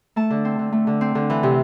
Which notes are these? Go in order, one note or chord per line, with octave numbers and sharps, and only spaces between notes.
A3 A5
D3
C4
D3
A3
D3
C4
D3
E3
C3